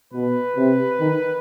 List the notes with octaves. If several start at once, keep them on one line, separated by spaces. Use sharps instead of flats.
B2 B4
C3
D#3